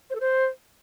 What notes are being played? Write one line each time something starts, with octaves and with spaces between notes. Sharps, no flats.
C5
A4
C5